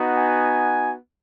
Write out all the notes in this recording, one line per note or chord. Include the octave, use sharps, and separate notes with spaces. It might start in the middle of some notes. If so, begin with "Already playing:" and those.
Already playing: B3 D#4 F#4
G#5